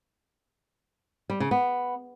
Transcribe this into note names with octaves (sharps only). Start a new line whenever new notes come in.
G3
C#3
B3